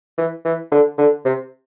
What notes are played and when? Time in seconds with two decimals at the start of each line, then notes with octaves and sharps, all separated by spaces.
0.18 E3
0.45 E3
0.72 D3
0.98 D3
1.25 C3